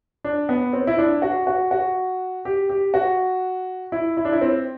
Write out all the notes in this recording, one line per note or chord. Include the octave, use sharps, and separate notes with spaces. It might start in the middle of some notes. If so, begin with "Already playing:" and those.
D4
B3
C4
E4
D4
F#4
F#4
F#4
G4
G4
F#4
E4
E4
D4
E4
C4